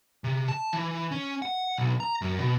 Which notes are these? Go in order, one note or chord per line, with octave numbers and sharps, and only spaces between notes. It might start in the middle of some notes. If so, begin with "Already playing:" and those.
C3
A5
E3
C#4
F#5
B1
A#5
F#2
B2